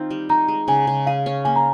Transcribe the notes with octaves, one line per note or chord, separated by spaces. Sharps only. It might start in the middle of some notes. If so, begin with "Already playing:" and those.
Already playing: D#3 C4 D#4 F4
G3
D#4 A#5
G#3
C#3 G#5
C#3
G#4 F5
C#4
A#3 G#5
A#5